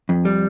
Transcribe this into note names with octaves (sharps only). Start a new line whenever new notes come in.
F2
G3